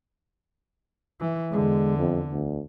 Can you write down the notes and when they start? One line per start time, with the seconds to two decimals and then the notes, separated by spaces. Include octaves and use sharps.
1.20 E3
1.52 E2 D3 G#3
1.98 F2
2.32 D2